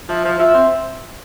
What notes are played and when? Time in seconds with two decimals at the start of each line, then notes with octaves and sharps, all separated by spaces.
0.08 F3 E5
0.24 F3
0.39 F3 E5
0.55 C4